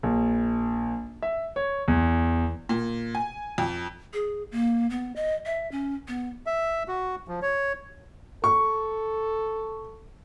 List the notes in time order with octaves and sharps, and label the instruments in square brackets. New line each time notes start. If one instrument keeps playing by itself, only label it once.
[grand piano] A#1
E5
C#5
E2
[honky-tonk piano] A#2
G#5
F2
[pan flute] G#4
A#3
B3
D#5
E5
C#4
B3
[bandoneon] E5
F#4
F3
C#5
[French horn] A4 [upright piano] C#6